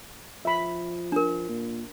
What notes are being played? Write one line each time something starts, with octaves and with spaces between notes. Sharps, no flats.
F3 E5 B5
D4 A#4
A#2